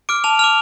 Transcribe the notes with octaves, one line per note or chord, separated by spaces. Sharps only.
D6 F6 D7
A5 F7
D6 F6 F7